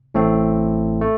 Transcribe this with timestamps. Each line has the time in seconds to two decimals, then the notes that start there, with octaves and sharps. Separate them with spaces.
0.14 A1 A2 A3 C4
1.01 A3